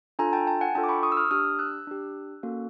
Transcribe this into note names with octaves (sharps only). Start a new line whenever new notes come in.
D4 F4 A4 G#5 A#5
G5 A5
G5 A5
F#5 G#5
D4 F4 A4 G5 A5
D6
B5 C#6
C#6 D#6
E6
D#6 F6
D4 G4 D#6 F6
E6 F#6
D4 G4
A#3 C#4 F#4 A4